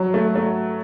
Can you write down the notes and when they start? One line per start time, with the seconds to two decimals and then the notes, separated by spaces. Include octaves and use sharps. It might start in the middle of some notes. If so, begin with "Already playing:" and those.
Already playing: F#3
0.14 A3
0.36 A3